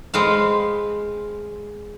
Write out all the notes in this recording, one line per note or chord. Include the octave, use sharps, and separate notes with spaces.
G#3 C4 B4 F5